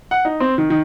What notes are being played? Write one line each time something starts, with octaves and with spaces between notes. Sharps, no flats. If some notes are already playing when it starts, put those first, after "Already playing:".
F#5
D#4
C4
D#3
D#3